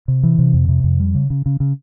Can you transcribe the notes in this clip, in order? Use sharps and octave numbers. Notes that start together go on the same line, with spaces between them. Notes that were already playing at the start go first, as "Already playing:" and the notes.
C3
E3
C3
F2
C3
F2
G3
C#3
C#3
C#3
C#3